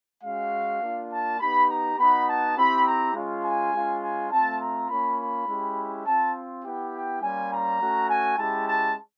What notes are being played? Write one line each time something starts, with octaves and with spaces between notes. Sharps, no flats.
G#3 C#4 F#4 F5
A#3 D4 F4
A5
B3 D#4 G4 B5
A#5
B3 D#4 F#4 B5
A5
C4 E4 G4 B5
A#5
G#3 C#4 F4
G#5
G#3 C#4 F4
G#5
A3 C4 F4 A5
A#5
A#3 C#4 F4 B5
B5
G#3 C#4 E4 G4
C4 F4 A5
B3 E4 G4 G5
G5
G3 A#3 C#4 F4 G#5
A#5
A3 C#4 F#4
G#5
G#3 C#4 E4 G4 A5
A5